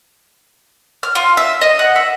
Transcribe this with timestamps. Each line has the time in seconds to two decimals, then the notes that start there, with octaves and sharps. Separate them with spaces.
1.03 F6
1.15 F4
1.37 E5
1.61 D#5
1.79 F#5
1.96 E5